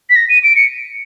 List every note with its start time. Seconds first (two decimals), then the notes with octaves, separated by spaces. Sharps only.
0.10 B6
0.16 A#6
0.29 D#7
0.44 D7
0.56 C#7